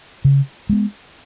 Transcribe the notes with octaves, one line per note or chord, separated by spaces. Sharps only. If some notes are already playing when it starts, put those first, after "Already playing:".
C#3
G#3 B3